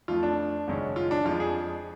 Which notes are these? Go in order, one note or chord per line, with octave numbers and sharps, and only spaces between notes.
F2 F3 A3 F4
D4
G#1 F#2 C#3 G#3 C#4
F4
D4
F2 F3 G#3 D4 F4
G#4